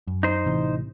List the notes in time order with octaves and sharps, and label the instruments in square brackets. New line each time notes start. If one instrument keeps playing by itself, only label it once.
[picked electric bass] F#2
[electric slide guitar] D#4 C5
[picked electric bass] A1 C3 E3